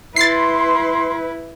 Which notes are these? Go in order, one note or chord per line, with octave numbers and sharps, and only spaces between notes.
E4 B4 C6 A6 C7